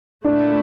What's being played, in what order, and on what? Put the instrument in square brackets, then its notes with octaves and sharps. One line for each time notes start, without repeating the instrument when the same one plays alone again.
[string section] A#2 A3 E4 [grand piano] D4